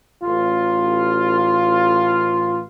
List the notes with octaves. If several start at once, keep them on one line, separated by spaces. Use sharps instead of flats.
A1 F4